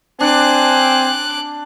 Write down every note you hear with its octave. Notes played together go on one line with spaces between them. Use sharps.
C4 D4 G#5 D6 F#6